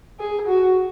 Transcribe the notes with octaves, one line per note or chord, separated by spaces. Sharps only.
G#4
F#4